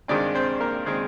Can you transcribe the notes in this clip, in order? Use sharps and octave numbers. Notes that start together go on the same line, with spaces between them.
G2 D#3 G#3 C4 D4 D5
C4 C5
A#3 A#4
D#3 G#3 C4 G#4